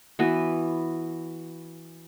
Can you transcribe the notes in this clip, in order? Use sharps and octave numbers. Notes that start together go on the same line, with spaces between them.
E3 B3 F#4 B4